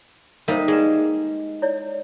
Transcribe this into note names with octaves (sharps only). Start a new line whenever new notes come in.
G3 A#3 D#4 A#4 C5
G#3 G#4 B4
E4 C#5 D5